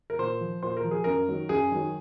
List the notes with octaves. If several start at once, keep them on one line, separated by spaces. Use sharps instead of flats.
A#4
A#2 C5
F3
A#2 C5
A#4
F3
G#4
F#2 A#4
D#3 F#3
F#2 G#4
D#3 F#3